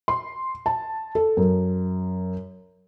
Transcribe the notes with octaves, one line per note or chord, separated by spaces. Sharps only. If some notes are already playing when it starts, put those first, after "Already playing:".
C6
A5
A4
F#2